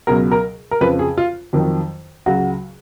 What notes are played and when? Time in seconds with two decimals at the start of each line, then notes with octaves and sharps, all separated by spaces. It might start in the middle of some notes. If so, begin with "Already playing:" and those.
0.07 C#2 B2 F#3 A#4
0.32 A#4
0.71 A#4
0.81 F2 C#3 F3 B4
0.99 G#4
1.18 F4
1.53 F2 D#3 F#3
2.26 C#2 C#3 F#3 F#4